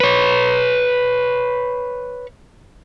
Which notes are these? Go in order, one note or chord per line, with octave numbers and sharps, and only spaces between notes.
B4 C#5